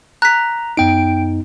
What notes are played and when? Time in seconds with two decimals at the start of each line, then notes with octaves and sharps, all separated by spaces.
0.22 A#5 F#6 B6
0.77 F#2 B3 D#4 G5 D7